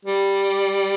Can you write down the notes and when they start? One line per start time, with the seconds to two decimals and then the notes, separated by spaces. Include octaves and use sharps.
0.05 G3